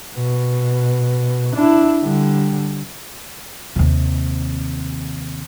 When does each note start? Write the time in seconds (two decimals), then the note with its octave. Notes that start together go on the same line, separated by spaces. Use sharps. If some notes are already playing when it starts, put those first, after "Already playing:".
0.15 B2
1.56 D4 E4
2.03 D3 G3
3.76 D#2 C3